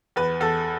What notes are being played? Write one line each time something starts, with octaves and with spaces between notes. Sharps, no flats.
E2 B4
E2 A4